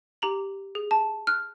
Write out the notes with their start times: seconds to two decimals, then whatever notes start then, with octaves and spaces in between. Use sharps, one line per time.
0.22 G4 A#5 F#7
0.75 G#4
0.91 A5
1.27 F6 F#6